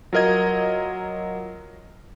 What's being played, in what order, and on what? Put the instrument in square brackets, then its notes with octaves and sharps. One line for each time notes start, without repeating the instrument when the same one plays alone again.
[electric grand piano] F#3 F4 A#4 D#5 G#6